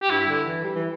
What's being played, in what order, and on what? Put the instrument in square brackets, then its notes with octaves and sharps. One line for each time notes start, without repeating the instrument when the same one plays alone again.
[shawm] G4
[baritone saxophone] G2 [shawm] E4
[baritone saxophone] D3
E3
G3
E3